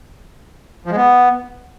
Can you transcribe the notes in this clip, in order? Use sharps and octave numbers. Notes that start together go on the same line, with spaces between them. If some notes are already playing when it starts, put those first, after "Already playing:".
F3
G#3
B3